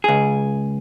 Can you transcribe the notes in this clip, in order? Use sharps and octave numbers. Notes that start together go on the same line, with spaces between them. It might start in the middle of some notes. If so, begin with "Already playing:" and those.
C#2 G#4